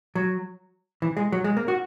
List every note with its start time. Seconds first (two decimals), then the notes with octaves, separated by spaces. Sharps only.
0.15 F#3
1.02 E3
1.17 G#3
1.32 F#3
1.44 G#3
1.57 A#3
1.68 F#4